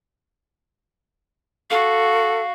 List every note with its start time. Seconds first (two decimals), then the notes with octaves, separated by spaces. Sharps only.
1.70 F#4 A4 F5